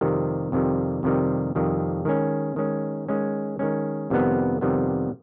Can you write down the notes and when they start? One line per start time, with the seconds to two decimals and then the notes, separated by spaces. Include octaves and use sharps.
0.01 F2 C3 D#3 G3
0.52 F2 C3 D#3 G3
1.03 F2 C3 D#3 G3
1.55 F2 C3 D#3 G3
2.05 D#3 G#3 C#4
2.56 D#3 G#3 C#4
3.08 D#3 G#3 C#4
3.59 D#3 G#3 C#4
4.10 F2 C3 D#3 G3 B3
4.61 F2 C3 D#3 G3 B3